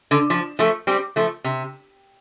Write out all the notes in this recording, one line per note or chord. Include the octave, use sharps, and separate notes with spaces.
D3
F3
F3 A3
G3 C4
F3 A3
C3